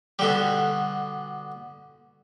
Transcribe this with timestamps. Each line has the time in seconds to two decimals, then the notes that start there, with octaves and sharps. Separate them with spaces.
0.19 B2 D3 G3